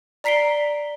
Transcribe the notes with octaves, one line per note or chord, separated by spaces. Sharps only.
D5 A#5 B6 C7 D7 G7